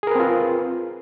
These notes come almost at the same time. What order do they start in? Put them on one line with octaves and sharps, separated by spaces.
G#4 A#4 B4 C4 F4